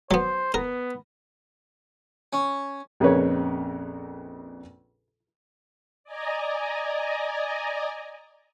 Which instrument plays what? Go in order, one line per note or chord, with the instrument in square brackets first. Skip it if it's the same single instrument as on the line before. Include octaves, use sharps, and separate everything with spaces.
[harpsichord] F#3 B3 [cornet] C5
[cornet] B3 [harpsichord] A#4
[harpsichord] C#4
[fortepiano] A#1 F2 C#3 A#4 B4 C#5
[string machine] D5 D#5 G#5 A#5